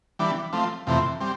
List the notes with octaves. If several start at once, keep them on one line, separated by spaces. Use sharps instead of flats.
E3 G3 B3 D4
F3 A3 C4
F2 C3 E3 A3 C4
G3 C4